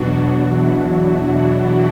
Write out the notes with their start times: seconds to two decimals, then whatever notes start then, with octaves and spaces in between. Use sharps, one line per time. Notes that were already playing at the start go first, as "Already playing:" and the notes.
Already playing: E2 B2 F#3 D4 F#4
0.45 E4